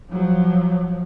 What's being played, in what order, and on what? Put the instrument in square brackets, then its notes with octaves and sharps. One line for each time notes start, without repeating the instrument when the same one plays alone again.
[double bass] F3 F#3